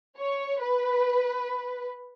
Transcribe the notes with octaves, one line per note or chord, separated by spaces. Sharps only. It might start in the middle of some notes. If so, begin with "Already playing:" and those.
C#5
B4